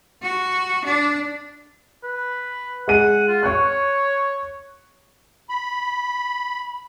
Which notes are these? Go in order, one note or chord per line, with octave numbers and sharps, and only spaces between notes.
F#4
D4
B4
G#3 F#5 D#7
F4
C#5 C#6 F#6
B5